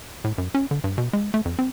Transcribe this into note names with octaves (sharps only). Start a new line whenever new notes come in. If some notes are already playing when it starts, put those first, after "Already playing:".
A2
F#2
C#4
D3
G2
B2
G#3
A3
F2
C4